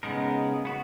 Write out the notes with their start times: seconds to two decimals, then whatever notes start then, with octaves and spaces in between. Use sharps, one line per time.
0.03 C#3 G#3 B3 D#4 A#4
0.65 B3 F#4